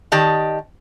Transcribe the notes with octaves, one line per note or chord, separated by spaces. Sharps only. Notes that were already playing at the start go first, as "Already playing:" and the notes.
D#3 G4 D5 D#5 A5